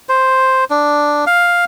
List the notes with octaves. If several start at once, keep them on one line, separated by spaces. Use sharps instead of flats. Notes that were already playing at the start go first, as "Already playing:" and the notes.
C5
D4
F5